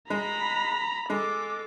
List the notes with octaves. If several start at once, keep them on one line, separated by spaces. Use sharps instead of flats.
G#3 A#5 B5
G#3 A4 D6